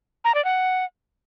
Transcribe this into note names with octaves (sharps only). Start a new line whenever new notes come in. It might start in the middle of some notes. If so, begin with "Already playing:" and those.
A#5
D5
F#5